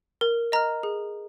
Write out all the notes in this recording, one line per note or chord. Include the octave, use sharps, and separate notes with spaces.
A#4
D#5 A#5 F6
G#4